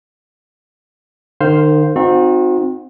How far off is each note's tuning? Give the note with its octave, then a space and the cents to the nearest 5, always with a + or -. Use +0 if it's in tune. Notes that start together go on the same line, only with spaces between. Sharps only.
D#3 -35 C5 +0 F5 +0
C4 -5 D#4 +0 F#4 -40